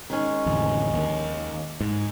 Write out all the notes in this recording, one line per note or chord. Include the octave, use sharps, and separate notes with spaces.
D#3 G#3 C#4
A1 F2 D3
D#2
G#2